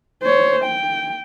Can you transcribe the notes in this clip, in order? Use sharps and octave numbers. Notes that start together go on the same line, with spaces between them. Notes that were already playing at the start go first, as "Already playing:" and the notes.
C5 C#5
G5